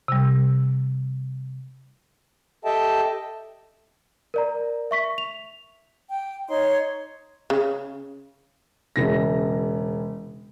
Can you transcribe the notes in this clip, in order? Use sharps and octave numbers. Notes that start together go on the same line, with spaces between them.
C3 G3
G4 A4 D#5 E5 G5 A5
A#4 D5 A#5
E5 C#6 B6
F7
G5
D#4 C#5 C6
C#3
E1 C#3 A#6